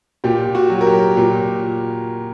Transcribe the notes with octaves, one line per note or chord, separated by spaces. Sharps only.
A#2 G4
F#4
F#3
A#4
G4
A#2